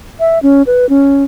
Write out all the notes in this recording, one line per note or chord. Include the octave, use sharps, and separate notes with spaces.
E5
C#4
B4
C#4